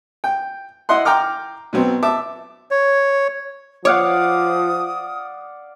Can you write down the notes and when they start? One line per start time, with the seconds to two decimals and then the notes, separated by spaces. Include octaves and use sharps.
0.24 G5
0.89 E4 D#5 F#5 C6
1.05 G5 A#5 D6 F6
1.73 B2 F#3 B3 C4
2.03 E5 A5 D6
2.71 C#5
3.85 F3 C#5 D5 F5 F#5 D#6